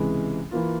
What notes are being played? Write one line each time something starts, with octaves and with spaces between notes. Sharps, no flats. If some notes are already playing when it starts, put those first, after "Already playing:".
Already playing: C#2 C3 E3 G#3
E3 A#3 F4